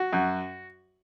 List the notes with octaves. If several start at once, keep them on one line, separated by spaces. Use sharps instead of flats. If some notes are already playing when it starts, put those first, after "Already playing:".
Already playing: F#4
F#2